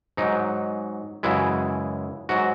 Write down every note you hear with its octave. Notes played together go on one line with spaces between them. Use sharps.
G#2 F#3 D#4
F#2 C#3 E3 G#3 E4
G#2 F#3 F#4